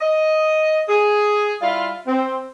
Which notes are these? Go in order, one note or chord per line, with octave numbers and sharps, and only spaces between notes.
D#5
G#4
G3 E4 F4
C4